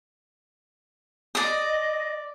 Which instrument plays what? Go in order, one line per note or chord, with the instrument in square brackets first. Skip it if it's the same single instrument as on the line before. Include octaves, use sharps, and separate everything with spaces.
[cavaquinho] D5 D#6 [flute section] D#5